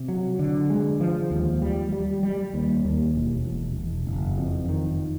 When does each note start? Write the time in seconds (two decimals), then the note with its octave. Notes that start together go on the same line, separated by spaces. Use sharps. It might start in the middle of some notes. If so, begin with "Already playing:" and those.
Already playing: C3
0.08 F#3
0.39 D3
0.70 G#3
1.00 F3
1.31 D#2
1.62 G3
1.92 G3
2.23 G3
2.54 D#2
2.85 D#2
3.15 E1
3.45 E1
3.77 E1
4.07 F#1
4.38 F2
4.69 D#3